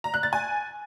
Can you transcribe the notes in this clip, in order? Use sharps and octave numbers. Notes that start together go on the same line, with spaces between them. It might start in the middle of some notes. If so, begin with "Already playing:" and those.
A#5
F#6
A6
G#5